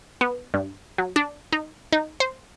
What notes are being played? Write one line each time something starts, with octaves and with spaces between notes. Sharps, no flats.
B3
G2
F#3
D4
D#4
D#4
C5